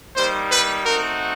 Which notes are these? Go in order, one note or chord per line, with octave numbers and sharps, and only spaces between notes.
G3 A#3 D#4 C5
B4
A3 C4 D#4 F#4 A#4